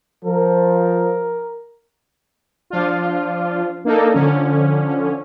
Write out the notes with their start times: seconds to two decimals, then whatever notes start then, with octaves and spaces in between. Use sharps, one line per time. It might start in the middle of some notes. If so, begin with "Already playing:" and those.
0.24 F3 A#4
2.70 F3 D4 F4
3.85 A#3 D4 D#4 A4
4.14 D3 F3 C#4